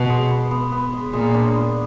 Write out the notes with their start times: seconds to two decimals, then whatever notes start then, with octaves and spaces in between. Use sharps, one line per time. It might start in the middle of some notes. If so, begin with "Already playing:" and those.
Already playing: B2
0.10 G#3
0.30 B3
0.51 B3
0.72 B3
0.93 G#3
1.13 A#2 G#3
1.34 D4
1.55 B3